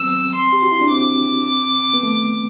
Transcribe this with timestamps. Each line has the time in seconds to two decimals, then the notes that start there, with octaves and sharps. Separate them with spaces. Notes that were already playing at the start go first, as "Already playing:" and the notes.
Already playing: F#3 G3 B3 C4 E6
0.35 C6
0.53 G4
0.63 F#4
0.71 E4
0.81 D4
0.91 C4 D6
1.94 B3
2.03 A3